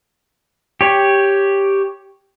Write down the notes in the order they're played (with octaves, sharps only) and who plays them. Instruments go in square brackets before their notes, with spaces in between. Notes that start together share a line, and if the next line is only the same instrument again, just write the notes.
[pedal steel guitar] G4 C#5